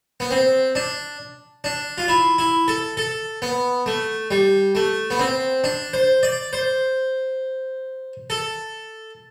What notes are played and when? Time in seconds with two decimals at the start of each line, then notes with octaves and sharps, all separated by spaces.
0.20 B3
0.31 C4
0.75 D4
1.64 D4
1.98 F4
2.08 E4
2.38 E4
2.68 A4
2.97 A4
3.42 B3
3.86 A3
4.31 G3
4.75 A3
5.11 B3
5.19 C4
5.64 D4
5.93 C5
6.23 D5
6.53 C5
8.30 A4